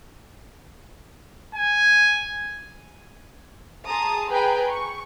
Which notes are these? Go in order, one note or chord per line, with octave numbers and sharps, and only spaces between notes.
G#5
G#4 A5 A#5 C6 D#6
G#4 B4 G5 G#5 A#5 B5
C#6